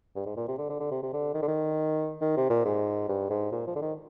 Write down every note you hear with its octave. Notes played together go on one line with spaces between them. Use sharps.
G2
G#2
A#2
C3
D3
D3
D3
C3
C3
D3
D#3
D3
D#3
D#3
C3
A#2
G#2
G2
G#2
A#2
F3
D3
D#3